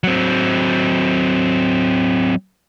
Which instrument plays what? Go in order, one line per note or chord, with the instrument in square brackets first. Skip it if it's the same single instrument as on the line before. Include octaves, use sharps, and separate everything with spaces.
[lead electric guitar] F#3 C4